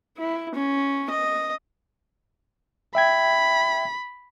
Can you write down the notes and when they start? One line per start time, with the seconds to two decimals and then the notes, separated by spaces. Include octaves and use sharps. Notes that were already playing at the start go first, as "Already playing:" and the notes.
0.17 E4
0.55 C#4
1.11 D#5
2.95 E5 G5 B5 G#6